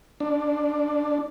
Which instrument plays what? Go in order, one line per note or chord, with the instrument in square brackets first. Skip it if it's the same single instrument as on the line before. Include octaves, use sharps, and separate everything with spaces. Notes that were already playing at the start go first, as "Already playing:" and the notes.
[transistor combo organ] D4